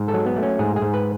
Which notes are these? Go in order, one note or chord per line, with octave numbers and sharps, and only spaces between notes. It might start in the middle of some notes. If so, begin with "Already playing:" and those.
Already playing: G#2
A4
F#3
B3
A3
C#4
G#2 G#4
G#4
G#2
B4